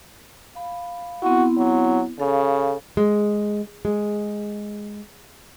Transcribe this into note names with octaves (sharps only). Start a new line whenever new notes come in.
F5 B5
B3 C4 E4 F#4
F#3
C#3 A4 F5
G#3
G#3